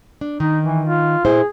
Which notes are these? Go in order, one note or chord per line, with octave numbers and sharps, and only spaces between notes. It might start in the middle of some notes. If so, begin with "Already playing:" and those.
D4
D#3 D#4
E3
F4
A#2 E4 G#4 C5